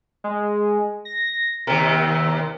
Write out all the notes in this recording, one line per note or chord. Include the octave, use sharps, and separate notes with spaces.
G#3
A#6
D#2 C3 A#4